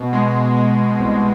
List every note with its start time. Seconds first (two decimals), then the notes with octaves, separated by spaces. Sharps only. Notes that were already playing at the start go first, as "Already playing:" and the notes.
Already playing: B2
0.13 G#3
0.56 G#3
0.99 C2